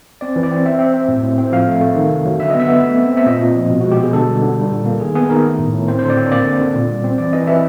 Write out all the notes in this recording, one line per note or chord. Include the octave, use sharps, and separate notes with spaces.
C4 D5
E3
D5
C4
C4 E5
C4
C4
A2
A2
C4
F3 F5
A3
A3
D#3
C3
F#3
D3 E5
B3 D#5
E5
B3
A3
C4
C4
E5
A#2 D#5
A#2
F3
B2
G#3 F#4
G4
B2 G#4
D3 A4
G3
D3
G3
A#2
A#3
D#3 G#4
B3 G#4
D#3 A#4
A3
A2
A2
C4 C5
D3 C5
D5
C4 C#5
A#3 D5
D3
D3
A#2
G3
C4
E3 D5
E3 D#5
E3 E5